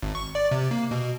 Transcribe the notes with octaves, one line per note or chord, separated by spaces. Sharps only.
G#1
C#6
D5
C3
A#3
B2